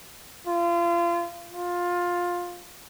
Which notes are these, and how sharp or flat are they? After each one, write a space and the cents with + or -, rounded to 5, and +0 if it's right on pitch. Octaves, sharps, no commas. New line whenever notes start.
F4 -30
F4 +15